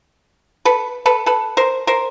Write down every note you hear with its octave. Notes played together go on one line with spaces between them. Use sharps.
A4 B4
A4 B4
A4 B4
A#4 C5
A#4 C5